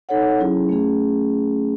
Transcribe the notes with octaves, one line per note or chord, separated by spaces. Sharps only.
D#4 A4 C#5 F#5
F#3 C#4 E4 G#4
A3 C#4 G#4